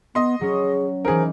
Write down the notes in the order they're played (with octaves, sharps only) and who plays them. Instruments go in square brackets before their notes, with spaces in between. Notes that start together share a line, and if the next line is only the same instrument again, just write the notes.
[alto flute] B3 [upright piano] D#5 C6
[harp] F#3 C#4 [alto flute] G#4
[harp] E3 D#4 [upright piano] G#4 A#4 [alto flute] C5